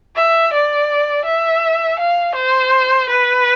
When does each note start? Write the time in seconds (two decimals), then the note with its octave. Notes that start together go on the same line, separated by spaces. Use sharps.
0.16 E5
0.53 D5
1.26 E5
1.99 F5
2.35 C5
3.10 B4